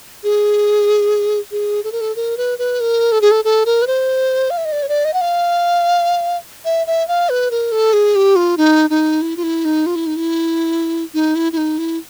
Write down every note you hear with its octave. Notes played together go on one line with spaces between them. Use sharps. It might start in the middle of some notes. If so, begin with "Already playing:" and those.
G#4
G#4
A4
A#4
A4
A#4
B4
B4
A#4
A4
G#4
A4
A4
A#4
B4
C5
F5
E5
D#5
D5
C#5
D5
D#5
F#5
F5
E5
E5
F5
B4
A#4
A4
G#4
G4
F4
D#4
D#4
E4
F4
E4
D#4
F4
E4
D#4
E4
D#4
E4
E4
D#4
E4